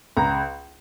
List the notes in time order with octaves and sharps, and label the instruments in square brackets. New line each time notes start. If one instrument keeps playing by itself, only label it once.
[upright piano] C#2 A#5